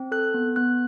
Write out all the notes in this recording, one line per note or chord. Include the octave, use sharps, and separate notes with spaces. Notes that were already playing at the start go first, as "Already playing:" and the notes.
Already playing: C4
A4 F#6
B3
B3 F#6